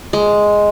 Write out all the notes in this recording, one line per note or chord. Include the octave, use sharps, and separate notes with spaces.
G#3